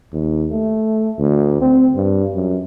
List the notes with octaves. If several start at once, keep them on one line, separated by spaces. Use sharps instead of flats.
D#2
A3
D2
C4
G2
F#2